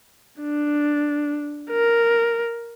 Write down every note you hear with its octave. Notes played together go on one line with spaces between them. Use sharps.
D4
A#4